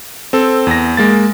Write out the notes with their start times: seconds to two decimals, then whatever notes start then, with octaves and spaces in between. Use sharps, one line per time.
0.33 C4 A4
0.67 E2 A#6
0.97 G#3 A#3 A6